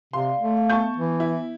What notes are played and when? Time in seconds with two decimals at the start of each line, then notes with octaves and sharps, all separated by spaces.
0.13 C3 D5 F5 C6
0.40 A3
0.57 F5
0.70 B3 A5 C#6 G6
0.97 E3
1.20 E4